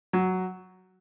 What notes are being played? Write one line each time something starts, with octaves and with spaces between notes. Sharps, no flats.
F#3